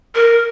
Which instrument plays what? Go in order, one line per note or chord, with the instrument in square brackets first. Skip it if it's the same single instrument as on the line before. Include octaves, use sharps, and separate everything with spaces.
[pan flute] A#4